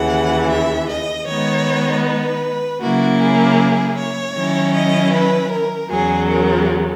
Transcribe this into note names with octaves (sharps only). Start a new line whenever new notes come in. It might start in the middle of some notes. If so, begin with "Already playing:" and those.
Already playing: D#2 C#3 E3 F#5
E5
D#5
D#3 G#3 B3 D#4 C#5
B4
C#3 F#3 A#3 E4 F#4
G#4
C#5
D#3 F#3 C#4 E4
D#5
B4
A#4
E2 C#3 F#3 G#4
A#4